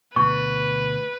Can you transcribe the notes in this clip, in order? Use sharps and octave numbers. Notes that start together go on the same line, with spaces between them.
D2 B2 B4 C#6